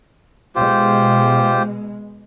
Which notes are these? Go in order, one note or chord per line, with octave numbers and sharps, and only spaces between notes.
B2 G#3 F4 G4 C5